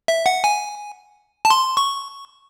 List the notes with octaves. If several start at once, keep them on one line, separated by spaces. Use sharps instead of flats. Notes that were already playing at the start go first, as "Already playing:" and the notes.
E5
F#5
G#5
A5
C6
C#6